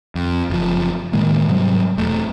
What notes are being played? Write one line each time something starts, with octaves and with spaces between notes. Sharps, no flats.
F2
F#1 F3
A2 D#3 G#3 A#3
G#2 C3 F#3 G3
E1 A3